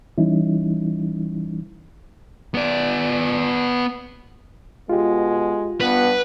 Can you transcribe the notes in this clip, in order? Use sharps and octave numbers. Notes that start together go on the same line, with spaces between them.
E3 G3 C#4 D#4 E4
B3 D5
B2 G#3 F4 G4
G2 B3 B4